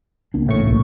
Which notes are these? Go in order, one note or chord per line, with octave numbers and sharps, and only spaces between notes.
C#2 A#3 D4
A1 A2 C#6
B1 C3 A#3